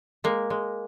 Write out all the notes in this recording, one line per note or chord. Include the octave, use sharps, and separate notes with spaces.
G#3 A#3
G#3